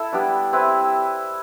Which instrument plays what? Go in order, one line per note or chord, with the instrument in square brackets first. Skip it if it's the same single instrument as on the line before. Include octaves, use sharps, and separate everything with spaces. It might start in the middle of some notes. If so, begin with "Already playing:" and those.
Already playing: [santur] E4 A4 E5
G3 B3 D4
C4 E4 B4